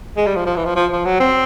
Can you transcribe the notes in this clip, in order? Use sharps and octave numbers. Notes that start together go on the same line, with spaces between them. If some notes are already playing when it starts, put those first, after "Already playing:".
G#3
G3
F3
F3
E3
F3
F3
F3
F#3
C4